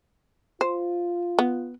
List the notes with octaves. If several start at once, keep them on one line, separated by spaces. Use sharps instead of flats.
F4 C5
B3